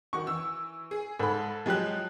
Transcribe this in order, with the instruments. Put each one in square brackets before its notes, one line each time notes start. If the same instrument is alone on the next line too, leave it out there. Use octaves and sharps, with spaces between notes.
[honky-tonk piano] D#3 F#4 [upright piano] C#6
[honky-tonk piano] E3 E6
G#4
[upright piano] G#2 B5 [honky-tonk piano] A4
[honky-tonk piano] F3 F#3 [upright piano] G#3 G4 F#6